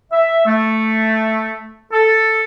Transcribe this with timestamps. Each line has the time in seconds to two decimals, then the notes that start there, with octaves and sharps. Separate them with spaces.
0.11 E5
0.46 A3
1.92 A4